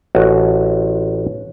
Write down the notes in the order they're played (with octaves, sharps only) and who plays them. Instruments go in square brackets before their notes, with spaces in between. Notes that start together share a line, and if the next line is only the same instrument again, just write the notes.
[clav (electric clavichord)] A1 F#4 C5 D#5